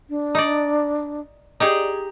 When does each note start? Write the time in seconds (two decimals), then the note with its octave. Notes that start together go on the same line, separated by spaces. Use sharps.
0.10 D4
0.35 D#4 D5
1.60 D#4 G4 G#4 D5